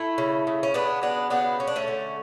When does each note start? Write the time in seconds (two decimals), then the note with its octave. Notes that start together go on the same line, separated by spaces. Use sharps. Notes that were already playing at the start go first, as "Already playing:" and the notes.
Already playing: A3 E4
0.18 C#3
0.47 C#3
0.63 C#4
0.74 C#3 B3 D4
1.02 F#3 B3 D4
1.30 C#3 B3 D4
1.59 G#3 C#4
1.68 D4
1.76 A3 C#4
1.88 D3